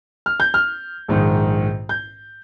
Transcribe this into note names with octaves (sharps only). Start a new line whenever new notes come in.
F6
G6
F6
A#1 G#2 D#3
G6